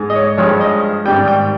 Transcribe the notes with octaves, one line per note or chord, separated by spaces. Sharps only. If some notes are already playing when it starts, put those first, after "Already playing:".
Already playing: G#2 G#3
D#5
C#5
G2 F3 G#3 C#5
D#5
G#2 D#3 G3 G5
G5